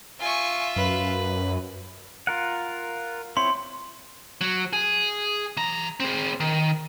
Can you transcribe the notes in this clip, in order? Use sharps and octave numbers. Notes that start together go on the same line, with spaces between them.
F4 E5 G#5 C#6
F#2 B4
F4 A#4 F#5
C4 E4 C#5 C6
F#3
G#4
E3 A#5
C4 G#4
D#3